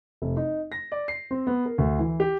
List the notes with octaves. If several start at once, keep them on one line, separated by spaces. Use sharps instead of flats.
F1
D#4
A#6
D5
C7
C4
B3
A#4
D2
E3
G4